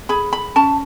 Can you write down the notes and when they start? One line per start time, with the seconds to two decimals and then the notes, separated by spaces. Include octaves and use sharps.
0.09 G#4 B5
0.33 B5
0.56 C#4 A5